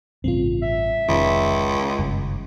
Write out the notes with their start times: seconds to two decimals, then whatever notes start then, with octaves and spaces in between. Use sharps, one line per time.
0.24 A1 G2 C#3 C4 F4
0.62 E5
1.08 F1 C#2 D#3
1.99 F#1 G2 C#3